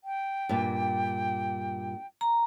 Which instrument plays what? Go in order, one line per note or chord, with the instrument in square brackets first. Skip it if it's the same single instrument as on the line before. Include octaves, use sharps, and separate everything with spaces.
[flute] G5
[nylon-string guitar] G2 A#2
[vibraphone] A#5